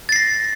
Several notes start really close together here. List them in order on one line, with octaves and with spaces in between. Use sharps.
A6 C7 A#6